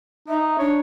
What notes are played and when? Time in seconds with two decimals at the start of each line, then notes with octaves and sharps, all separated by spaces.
0.28 D#4 E5
0.59 D4 C#5